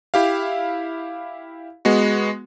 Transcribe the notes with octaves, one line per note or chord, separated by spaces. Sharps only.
E4 G4 F5
G#3 B3 F#4